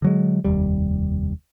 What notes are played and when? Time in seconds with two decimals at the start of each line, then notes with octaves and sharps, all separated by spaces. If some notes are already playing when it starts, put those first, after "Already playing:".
0.02 D3 F#3 G#3
0.44 F1 D#2 G3